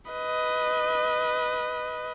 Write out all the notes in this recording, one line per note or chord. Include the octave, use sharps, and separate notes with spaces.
B4 D#5